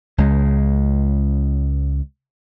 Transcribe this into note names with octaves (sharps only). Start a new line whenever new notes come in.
C#2 G#3